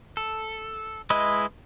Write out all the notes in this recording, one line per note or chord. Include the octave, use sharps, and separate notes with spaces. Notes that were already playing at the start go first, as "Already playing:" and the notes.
A4
G#3 E4 B4 D#5